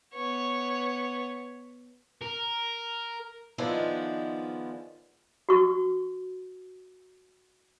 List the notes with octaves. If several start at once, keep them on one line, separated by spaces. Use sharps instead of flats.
B3 C#5
A#4
D#3 F3 G#3 B3 D4 E4
F#4 C#6